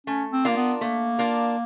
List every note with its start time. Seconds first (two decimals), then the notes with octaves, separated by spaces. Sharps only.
0.07 A3 C#4
0.32 C4
0.45 A#3 D4 F4 A#4
0.56 B3
0.81 A3 A#3
1.19 D4 F4 A#4